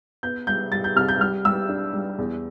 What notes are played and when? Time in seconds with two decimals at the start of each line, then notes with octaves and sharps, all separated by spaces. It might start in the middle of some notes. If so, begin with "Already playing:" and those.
0.23 B3 G6
0.47 G3 G6
0.72 G3 A6
0.84 G6
0.96 C2 F6
1.09 G6
1.20 G3 F6
1.45 G3 E6
1.69 D4
1.94 G3
2.18 E2